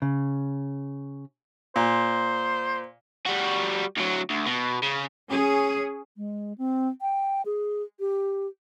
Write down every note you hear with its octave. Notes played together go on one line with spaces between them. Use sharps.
C#3
A#2 C5
G3 F#4
D2 F#3
D2
B2
C#3
C#4 G#4
G#3
C4
G5
G#4
G4